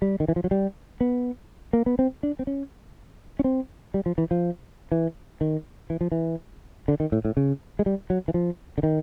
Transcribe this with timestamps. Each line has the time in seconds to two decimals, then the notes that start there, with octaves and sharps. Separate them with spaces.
0.02 G3
0.20 D#3
0.28 E3
0.36 F3
0.44 F#3
0.51 G3
1.01 B3
1.73 A#3
1.86 B3
1.99 C4
2.23 D4
2.39 C4
2.47 C#4
3.39 C#4
3.44 C4
3.94 G3
4.06 F3
4.18 E3
4.31 F3
4.92 E3
5.41 D#3
5.90 E3
6.01 F3
6.12 E3
6.88 D3
7.00 D#3
7.12 A2
7.25 A2
7.37 C#3
7.79 G#3
7.86 G3
8.10 F#3
8.28 E3
8.34 F3
8.78 D3
8.83 D#3